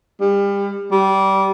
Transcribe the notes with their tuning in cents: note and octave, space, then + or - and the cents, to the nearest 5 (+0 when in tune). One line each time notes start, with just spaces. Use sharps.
G3 +30
G3 -20